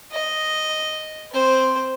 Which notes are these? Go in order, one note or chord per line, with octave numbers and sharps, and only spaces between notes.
D#5
C4 C5